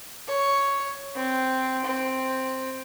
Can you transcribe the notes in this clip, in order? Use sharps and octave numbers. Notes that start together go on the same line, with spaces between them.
C#5
C4
C4